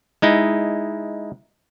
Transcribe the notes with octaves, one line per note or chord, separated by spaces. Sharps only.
G#3 D#4 E4